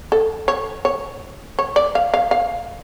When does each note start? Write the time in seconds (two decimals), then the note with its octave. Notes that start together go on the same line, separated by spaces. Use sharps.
0.12 A4
0.48 C#5
0.85 C#5
1.59 C#5
1.76 D5
1.95 F5
2.14 F5
2.31 F5